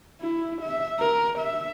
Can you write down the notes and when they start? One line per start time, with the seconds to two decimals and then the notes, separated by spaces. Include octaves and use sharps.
0.21 E4
0.62 E5
1.00 A#4
1.39 E5